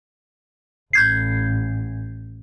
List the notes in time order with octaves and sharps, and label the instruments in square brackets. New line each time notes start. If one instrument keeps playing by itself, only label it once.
[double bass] A1 [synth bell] G6 G#6 C7